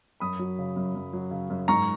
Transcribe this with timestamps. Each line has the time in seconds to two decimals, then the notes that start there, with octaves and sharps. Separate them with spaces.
0.20 F#2 B5 D#6
0.39 F#3
0.59 C#3
0.76 F#2
0.95 F#2
1.13 F#3
1.31 C#3
1.50 F#2
1.68 G#2 A#5 C#6